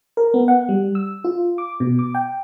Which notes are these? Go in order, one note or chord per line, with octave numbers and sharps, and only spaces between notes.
A#4
B3
F#5
G3
E6
F4
D6
B2
D6
G5